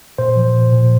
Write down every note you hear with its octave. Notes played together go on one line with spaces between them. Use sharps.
A#2 C5
F3
A#2
A#2